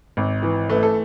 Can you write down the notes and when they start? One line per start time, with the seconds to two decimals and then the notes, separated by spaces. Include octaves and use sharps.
0.17 G#1
0.43 E3
0.69 A3 B4
0.83 A4